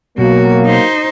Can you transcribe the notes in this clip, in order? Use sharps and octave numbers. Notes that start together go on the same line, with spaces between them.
B2 F#3 A#3 F#4
D#4 C5